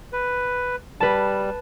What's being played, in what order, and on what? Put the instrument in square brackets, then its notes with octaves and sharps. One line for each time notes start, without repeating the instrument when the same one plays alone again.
[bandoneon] B4
[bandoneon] G3 [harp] B4 A5